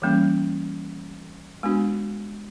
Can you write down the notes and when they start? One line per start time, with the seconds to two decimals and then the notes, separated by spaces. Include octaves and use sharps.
0.02 E3 G3 A#3 C#4
1.63 G#3 B3 D4 F#4